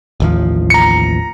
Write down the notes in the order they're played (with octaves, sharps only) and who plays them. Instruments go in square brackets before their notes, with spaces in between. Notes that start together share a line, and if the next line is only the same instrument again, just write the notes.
[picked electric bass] A1 D#2 F3
[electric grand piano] A#5 C#7